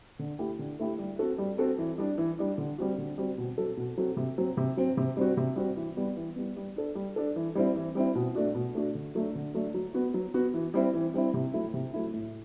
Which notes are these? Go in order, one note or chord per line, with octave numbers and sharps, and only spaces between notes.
D3
A3 E4 G4
D3
A3 E4 G4
G3
C4 F#4 A4
G3
C4 F#4 A4
E3
G3 D4
E3
G3 D4
D3
G3 C4 F#4
D3
G3 C4 F#4
B2
F#3 C4 F#4 A4
B2
F#3 C4 F#4 A4
C3
F#3 C4
C3
F#3 C4
C3
G3 C4 F#4
C3
G3 C4 F#4
E3
G3 B3
E3
G3 B3
G3
D4 A4
G3
D4 A4
E3
G3 C4 E4
E3
G3 C4 E4
B2
A3 D4 F#4
B2
A3 D4 F#4
D3
F#3 A3 D4
D3
F#3 A3 D4
F#3
B3 F#4
F#3
B3 F#4
E3
G3 C4 E4
E3
G3 C4 E4
C3
F#3 A3 E4
C3
F#3 A3 E4
A2